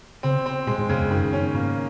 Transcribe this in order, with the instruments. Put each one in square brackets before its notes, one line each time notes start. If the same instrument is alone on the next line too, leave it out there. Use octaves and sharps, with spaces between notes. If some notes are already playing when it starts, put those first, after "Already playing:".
[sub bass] C#3 [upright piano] C4
[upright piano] C4
[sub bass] A#2 [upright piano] G#3
[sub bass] G#2
[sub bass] F#2 [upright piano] C#3
[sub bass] F2
[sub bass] F#2 [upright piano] D#3
[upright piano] C#4
[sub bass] G#2 [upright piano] A#3